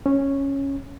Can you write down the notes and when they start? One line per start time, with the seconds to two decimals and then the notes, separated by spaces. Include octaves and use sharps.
0.06 C#4